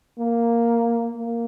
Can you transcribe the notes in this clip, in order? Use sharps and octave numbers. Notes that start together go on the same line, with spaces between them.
A#3
A#3